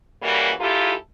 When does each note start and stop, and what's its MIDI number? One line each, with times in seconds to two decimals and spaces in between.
0.22 0.49 49
0.22 0.49 52
0.22 0.49 55
0.22 0.49 58
0.22 0.49 66
0.59 0.92 44
0.59 0.92 64
0.59 0.92 65
0.59 0.92 67
0.59 0.92 69